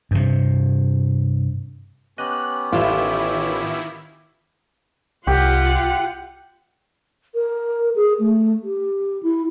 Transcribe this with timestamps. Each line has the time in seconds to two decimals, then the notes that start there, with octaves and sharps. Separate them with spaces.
0.11 G2 C3
2.18 B3 C#4 G4 D#5 F#6
2.73 A1 D#3 E4 F4 F5 A5
5.27 C2 F4 G4 F#5
7.35 A#4
7.96 G#4
8.19 A3
8.63 G4
9.23 E4